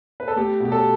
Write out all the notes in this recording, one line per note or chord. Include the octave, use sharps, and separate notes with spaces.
B4
A4
A3 G4
B2
G4
A4